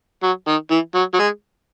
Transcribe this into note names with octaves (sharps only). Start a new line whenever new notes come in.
F#3
D#3
E3
F#3
F#3
G#3